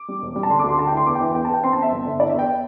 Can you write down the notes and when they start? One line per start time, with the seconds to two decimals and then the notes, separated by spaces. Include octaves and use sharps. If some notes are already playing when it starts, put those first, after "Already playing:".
Already playing: D6
0.08 G3
0.22 E1
0.36 G3
0.43 A5
0.50 D3 C6
0.59 D6
0.64 D2
0.69 C6
0.78 D3 A5
0.87 G5
0.92 E4 C6
1.06 E2 D6
1.15 G5
1.21 E3
1.34 E2 G5
1.45 A5
1.49 E2 G5
1.63 C4 C6
1.73 A5
1.77 C4
1.82 E5
1.92 G1
2.06 D3
2.20 E4 D5
2.29 E5
2.33 E2
2.39 G5